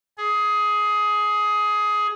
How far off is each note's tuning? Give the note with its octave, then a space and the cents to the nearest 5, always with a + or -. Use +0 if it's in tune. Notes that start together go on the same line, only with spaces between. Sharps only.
G#4 +15